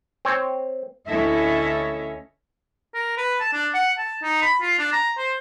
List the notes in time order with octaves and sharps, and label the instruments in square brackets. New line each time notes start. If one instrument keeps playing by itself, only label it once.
[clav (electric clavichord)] C4 C#5
[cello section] D2 C#4 E4 A4 D#5 E5
[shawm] A#4
B4
A5
D4
F#5
A5
D#4
B5
F4
D4
A#5
C5